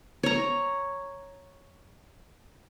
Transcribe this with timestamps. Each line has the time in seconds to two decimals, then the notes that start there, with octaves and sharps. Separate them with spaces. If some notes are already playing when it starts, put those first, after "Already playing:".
0.23 C#5 A#5